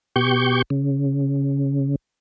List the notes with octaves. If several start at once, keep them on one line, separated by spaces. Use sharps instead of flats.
B2 G4 C#6 G6
C#3